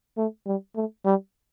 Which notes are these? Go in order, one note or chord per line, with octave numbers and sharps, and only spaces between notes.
A3
G3
A3
G3